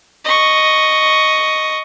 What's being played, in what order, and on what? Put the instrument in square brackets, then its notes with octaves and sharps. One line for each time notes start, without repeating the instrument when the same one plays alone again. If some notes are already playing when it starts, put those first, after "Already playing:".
[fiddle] D#5 C#6